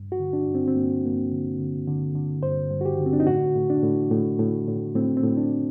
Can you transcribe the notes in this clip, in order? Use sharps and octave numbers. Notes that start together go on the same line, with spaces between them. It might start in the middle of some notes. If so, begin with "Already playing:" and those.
Already playing: G2
F#4
D3
D4
G2
C4
C4
G2 A#3
G2 A#3
C4
D3
D3
D3
D3
G2 C5
G2
F#4
G4
D3
C4
D4
D#4
A2 F#4
A2
D4
A2
A2
A2
A2
A2 C4
C4
A2
D4
A2